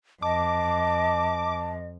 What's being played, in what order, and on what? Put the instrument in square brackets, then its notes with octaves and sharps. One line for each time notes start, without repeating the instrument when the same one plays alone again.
[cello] F2 [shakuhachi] D#5 [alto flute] A5 [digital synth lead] D6